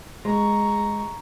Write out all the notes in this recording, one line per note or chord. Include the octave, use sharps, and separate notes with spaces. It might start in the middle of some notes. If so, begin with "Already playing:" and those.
G#3 A#5 C#6